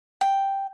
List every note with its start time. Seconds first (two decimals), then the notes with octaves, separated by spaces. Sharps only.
0.21 G5